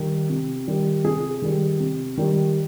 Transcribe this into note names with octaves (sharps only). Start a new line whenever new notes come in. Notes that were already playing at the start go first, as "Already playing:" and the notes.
Already playing: D#3 G3
C3
D#3 G3
C3 G#4
D#3 G3
C3
D#3 G3